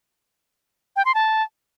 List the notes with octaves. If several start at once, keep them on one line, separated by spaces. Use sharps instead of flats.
G5
C6
A5